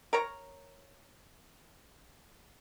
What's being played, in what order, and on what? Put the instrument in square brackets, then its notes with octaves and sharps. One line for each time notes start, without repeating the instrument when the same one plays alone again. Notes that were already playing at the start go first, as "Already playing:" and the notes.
[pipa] A#4 C#5 A#5